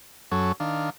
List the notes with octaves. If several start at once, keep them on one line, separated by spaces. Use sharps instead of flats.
F#2 F#3 C#4 A4 C#6
D#3 D4 F5